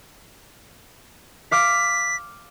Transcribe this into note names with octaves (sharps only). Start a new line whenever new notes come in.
F5 D6 F6 B6